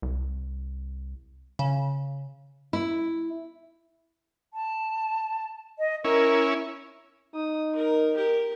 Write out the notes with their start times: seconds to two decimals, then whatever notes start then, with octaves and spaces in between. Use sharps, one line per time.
0.02 C2
1.59 C#3
2.73 E4
4.54 A5
5.79 D#5
6.04 C#4 E4 A#4
7.34 D#4 D#6
7.75 A#4
8.14 G4 A#4